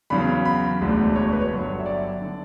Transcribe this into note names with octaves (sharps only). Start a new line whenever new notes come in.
E2 C#3 F#3 B5
B5
E1 D2 D3
C#5
B4
C#5
G1 G2 F#3
E5
D5
D3